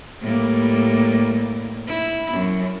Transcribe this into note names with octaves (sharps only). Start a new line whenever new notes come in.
A2 G3 A#3
E4
F#2